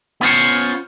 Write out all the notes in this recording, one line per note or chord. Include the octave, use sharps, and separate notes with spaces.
B3 C#4 F4 C5 C#5